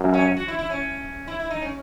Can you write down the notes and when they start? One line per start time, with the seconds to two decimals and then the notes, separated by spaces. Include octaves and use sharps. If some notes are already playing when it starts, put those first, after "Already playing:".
Already playing: F#2
0.14 C#4
0.37 F#4
0.48 E4
0.59 E4
0.70 C#4
1.28 E4
1.40 E4
1.50 D#4
1.62 C#4